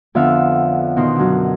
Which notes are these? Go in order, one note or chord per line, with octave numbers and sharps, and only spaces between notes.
F2 D3 B3 E5 F5
B2 D#3 D#4 C6
F#2 D3